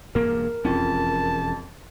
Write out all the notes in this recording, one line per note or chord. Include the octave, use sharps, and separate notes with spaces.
E1 G2 A#3 A#4
E1 F2 C#4 A5